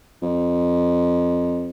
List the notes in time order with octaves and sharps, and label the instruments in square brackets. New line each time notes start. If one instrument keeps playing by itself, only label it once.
[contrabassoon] F2